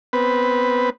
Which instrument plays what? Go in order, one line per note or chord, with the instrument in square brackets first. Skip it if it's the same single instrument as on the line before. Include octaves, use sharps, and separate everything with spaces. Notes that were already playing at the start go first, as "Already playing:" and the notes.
[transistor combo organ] B3 C4 B4